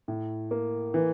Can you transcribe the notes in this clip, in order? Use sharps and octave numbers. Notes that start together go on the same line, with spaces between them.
A2
A#3
E3